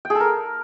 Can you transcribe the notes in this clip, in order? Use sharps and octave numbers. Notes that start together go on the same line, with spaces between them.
G5
G#4
A4
A#4